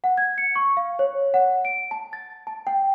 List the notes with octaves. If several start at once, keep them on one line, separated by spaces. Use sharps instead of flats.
F#5
G#6
C#7
C#6
F5
C#5
F#5
D7
A5
A6
A5
G5